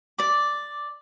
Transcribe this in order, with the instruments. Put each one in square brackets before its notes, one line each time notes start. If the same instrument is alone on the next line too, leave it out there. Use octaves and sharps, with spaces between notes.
[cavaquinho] D5 D6